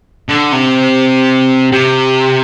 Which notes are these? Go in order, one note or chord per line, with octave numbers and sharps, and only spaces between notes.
D3
C3
C3